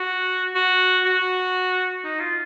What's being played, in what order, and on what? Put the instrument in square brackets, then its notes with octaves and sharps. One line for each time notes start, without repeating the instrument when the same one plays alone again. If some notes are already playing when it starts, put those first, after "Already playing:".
Already playing: [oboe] F#4
F#4
F#4
D#4
F4